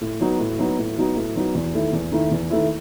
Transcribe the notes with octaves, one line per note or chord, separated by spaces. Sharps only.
A2
F#3 B3 D#4 F#4
A2
F#3 B3 D#4 F#4
A2
F#3 B3 D#4 F#4
A2
F#3 B3 D#4 F#4
E2
D#3 A3 E4
E2
D#3 A3 E4
E2
D#3 A3 E4